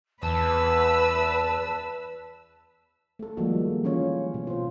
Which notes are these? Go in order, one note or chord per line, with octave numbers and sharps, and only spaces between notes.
E2 B4 A5 B5 E6
A3 A4
D#3 F3 G3 G#3 A#3 F#4
E3 C#4 F4 C#5
B2
F4 C5